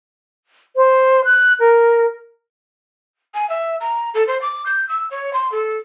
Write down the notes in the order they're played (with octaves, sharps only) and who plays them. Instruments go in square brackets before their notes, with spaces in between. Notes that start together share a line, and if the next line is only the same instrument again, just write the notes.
[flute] C5
F#6
A#4
[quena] G#5
E5
A#5
A4
C5
D6
G6
E6
C#5
C6
A4